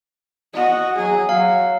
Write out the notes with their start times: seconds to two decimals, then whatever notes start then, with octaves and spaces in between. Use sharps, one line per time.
0.53 F#4 D#5
0.96 F#3 G#4
1.29 F#3 F5